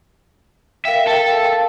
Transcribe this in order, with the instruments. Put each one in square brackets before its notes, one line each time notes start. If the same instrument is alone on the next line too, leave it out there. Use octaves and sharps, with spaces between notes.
[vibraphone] A#4 F5 G5 [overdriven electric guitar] E5
[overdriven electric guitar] A4